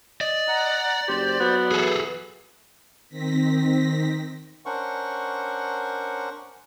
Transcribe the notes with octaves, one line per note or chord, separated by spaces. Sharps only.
D5 D#5
F#5 A#5
F#1 G4 C5
F#3 B3
E3 G#4 A4
D#3 C4 A#6 B6
C#4 D4 A#4 C5 F#5 C#6